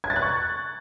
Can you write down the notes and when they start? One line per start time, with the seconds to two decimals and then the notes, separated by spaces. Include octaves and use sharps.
0.04 G#6
0.10 A6
0.16 F#6
0.22 C#6